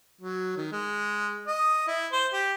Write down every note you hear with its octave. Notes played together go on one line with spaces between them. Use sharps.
F#3
D#3
G#3
D#5
E4
C5
G4